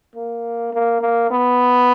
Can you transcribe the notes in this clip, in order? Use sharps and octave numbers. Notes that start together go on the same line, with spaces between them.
A#3
A#3
A#3
B3